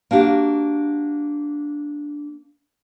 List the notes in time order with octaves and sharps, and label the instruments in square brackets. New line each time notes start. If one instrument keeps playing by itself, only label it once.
[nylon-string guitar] A#3 D4 F#4 G4